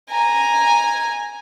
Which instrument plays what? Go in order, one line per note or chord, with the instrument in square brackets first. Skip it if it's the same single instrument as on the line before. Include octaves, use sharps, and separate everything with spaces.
[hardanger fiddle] G#5 A#5